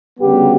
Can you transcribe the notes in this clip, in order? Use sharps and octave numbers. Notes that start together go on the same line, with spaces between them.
D2 C#3 G3 B3 G4